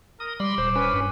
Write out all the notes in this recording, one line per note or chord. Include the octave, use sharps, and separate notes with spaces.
A#4 D#6
G3 B5 C6 D6
D#1 C5
C#4 B4
G2